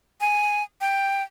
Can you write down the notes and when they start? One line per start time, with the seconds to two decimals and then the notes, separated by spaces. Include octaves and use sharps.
0.21 G#5
0.81 G5